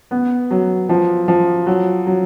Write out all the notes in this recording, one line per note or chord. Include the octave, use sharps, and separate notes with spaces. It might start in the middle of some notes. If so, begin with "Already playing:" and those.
B3
F#3
F3
F3
F#3
F#3